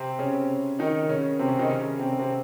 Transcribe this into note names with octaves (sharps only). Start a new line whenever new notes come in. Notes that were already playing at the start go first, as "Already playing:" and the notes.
Already playing: C3 C4
C#3 C#4
D#3 D#4
C#3 C#4
C3 C4
C#3 C#4
D#3 D#4
C#3 C#4
C3 C4
C3 C4